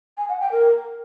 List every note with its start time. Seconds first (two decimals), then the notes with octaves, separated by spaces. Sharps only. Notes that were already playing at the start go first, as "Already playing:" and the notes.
0.17 G#5
0.29 F#5
0.40 G5
0.52 A#4